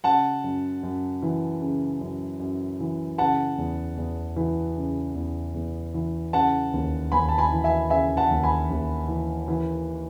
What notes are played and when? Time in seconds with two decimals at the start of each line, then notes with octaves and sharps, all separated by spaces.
0.04 C#3 F#5 A5
0.44 F#2
0.83 F#2
1.22 E3
1.61 C#3
2.01 F#2
2.40 F#2
2.80 E3
3.18 C#3 F#5 A5
3.58 E2
3.97 E2
4.36 E3
4.77 C#3
5.15 E2
5.54 E2
5.94 E3
6.33 C#3 F#5 A5
6.73 D#2
7.12 D#2 G#5 B5
7.29 A5
7.38 G#5 B5
7.52 E3
7.64 E5 G#5
7.90 C#3 E5 G#5
8.17 F#5 A5
8.31 D#2
8.43 G#5 B5
8.70 D#2
9.08 E3
9.48 E3